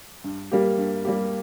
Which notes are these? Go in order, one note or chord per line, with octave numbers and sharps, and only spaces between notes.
G2
G3 A#3 G4
G2
G3 A#3 G4